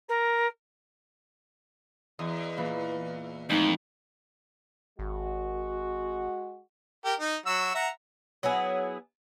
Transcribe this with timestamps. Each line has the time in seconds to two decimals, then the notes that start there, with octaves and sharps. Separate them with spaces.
0.08 A#4
2.19 E2 D#5
2.57 A#2 E3 B4
3.50 F2 A2 G#3 D#4
4.99 G#1 G#3 F#4
7.05 G4 A#4
7.20 D#4
7.46 F#3 F#4 E6
7.75 E5 F#5 A#5
8.43 F#3 B3 E4 G#4